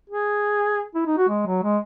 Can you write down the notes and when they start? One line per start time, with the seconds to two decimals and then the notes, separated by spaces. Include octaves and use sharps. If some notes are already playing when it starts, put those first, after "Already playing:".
0.10 G#4
0.95 E4
1.07 D#4
1.18 F#4
1.29 G#3
1.47 F#3
1.63 G#3